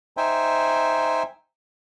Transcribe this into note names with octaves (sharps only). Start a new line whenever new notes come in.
D#4 C5 E5 G5 G#5